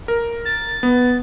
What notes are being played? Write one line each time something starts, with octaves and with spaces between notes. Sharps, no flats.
A#4
A6
B3